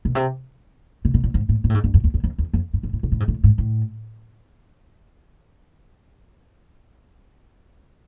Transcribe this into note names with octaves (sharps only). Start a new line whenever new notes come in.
B2
C3
C3
B2
A#2
G#2
A2
A#2
A2
G#2
G2
F#2
E2
E2
F2
E2
F2
G2
G#2
A2
A#2
A2
G#2
A2
G#2
A2